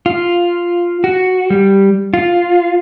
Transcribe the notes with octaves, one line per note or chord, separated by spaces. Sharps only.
F4
F#4
G3
F4